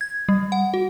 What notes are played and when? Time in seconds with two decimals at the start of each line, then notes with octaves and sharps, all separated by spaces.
0.01 G#6
0.29 G3
0.52 F#5
0.74 F#4